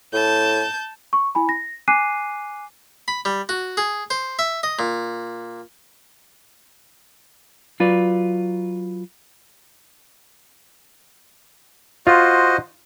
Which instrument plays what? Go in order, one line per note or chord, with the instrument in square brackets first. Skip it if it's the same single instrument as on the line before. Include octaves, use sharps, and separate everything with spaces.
[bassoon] A2 [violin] A5 G6
[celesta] C#6
E4 G#5 B5
A#6
G#5 D6 F#6 C7 D#7
[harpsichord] B5
G3
F#4
G#4
C5
E5
D#5
A#2
[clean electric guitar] F#3 F4 B4 D5
[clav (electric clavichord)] F4 [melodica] F#4 C5 D#5